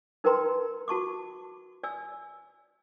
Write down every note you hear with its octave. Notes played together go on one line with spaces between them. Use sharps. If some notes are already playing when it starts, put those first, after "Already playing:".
D#4 A#4 B4 G5 A#5 C6
F#4 A5 C#6 D6
D5 G#5 E6